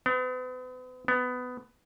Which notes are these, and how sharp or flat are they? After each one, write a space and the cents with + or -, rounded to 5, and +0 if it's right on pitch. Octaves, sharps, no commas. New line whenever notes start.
B3 +40
B3 +15